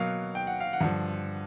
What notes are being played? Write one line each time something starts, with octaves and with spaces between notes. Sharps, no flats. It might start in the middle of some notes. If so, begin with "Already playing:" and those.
Already playing: B2 F#3 A#3 F5
G5
F#5
F5
F#5
G2 D3 F3